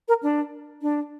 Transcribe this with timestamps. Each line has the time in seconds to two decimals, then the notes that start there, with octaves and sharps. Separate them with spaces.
0.08 A#4
0.23 D4
0.82 D4